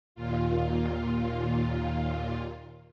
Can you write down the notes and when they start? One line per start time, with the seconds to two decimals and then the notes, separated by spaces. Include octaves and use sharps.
0.15 D#2 A#2 F4